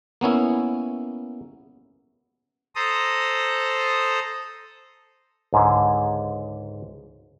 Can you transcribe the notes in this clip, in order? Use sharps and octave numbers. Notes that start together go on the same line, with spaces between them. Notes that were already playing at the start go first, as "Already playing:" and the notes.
A#3 B3 C#4 E4
A4 C5 A#5 D#6
C#2 G#2 D3 G#4